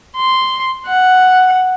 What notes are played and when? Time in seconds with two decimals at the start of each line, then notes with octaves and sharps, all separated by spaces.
0.17 C6
0.87 F#5